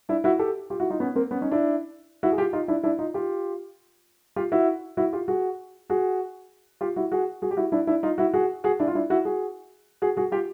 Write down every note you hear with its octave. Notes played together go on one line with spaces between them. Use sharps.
D4 E4
E4 F#4
G4 A4
F4 G4
E4 F#4
D#4 F4
B3 C#4
A#3 C4
B3 C#4
C#4 D#4
D4 E4
E4 F#4
G#4
F4 G4
D#4 F4
D4 E4
D4 E4
D#4 F4
F4 G4
F4 G4
E4 F#4
E4 F#4
F4 G4
F#4 G#4
F#4 G#4
F4 G4
E4 F#4
F#4 G#4
F#4 G#4
G4
E4 F#4
D4 E4
D4 E4
D#4 F4
E4 F#4
F#4 G#4
F#4 G#4
D4 E4
F4
D4 E4
E4 F#4
F#4 G#4
F#4 G#4
F#4 G#4
F4 G4